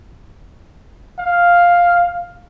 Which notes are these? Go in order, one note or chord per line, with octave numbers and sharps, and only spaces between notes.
F5